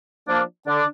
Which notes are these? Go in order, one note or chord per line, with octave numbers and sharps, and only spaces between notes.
F3 A#3 D4
D3 D4